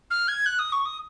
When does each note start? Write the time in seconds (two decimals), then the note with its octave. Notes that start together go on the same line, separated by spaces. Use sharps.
0.11 F6
0.28 G#6
0.46 F#6
0.59 D#6
0.72 C#6
0.85 D#6